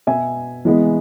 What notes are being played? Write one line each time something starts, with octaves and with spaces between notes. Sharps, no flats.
B2 B3 E5 G#5
E3 G#3 B3